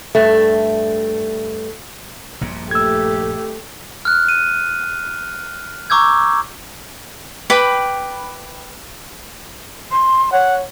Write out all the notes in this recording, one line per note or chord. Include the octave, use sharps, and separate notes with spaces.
G2 A3
A#1 G2 A#2
A3 G4 E6 G#6
F6 F#6
D#7
A#5 C#6 D6 E6 G6 G#6
B4 G5 B5 D6
C6
C#5 F#5